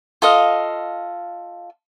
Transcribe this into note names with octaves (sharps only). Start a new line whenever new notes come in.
F4 A4 D#5 F5